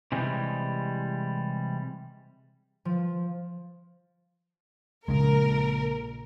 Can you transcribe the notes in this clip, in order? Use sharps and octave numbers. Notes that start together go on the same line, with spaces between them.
C3 E3 G3 G#3
F3
A#1 C#3 G#3 A#4